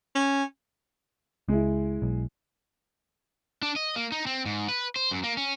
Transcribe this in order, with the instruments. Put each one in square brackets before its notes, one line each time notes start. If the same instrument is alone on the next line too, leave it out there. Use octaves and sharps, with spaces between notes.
[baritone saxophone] C#4
[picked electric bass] C#2 [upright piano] G#3 E4
[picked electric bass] B1
[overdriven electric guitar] D4
D#5
A#3
D#4
C4
G#2
B4
C5
F#2
A#3
C#4